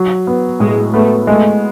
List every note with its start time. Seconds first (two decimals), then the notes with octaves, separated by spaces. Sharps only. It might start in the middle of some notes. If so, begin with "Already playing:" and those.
Already playing: F#3
0.27 B3
0.60 A2 G#3
0.94 A3 B3
1.27 G#3 A3